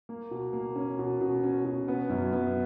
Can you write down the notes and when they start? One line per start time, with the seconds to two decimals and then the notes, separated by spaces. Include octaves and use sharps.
0.09 A#3
0.31 B2
0.53 A#3
0.75 C#4
0.98 B2
1.21 B2
1.43 C#4
1.65 B2
1.88 B3
2.10 F#2
2.33 B3